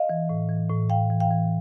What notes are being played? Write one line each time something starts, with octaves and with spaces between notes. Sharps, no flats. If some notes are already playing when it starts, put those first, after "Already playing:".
Already playing: D#5 F5
E3
A2
E3
A2
A2 F5 G5
E3
F5 G5
E3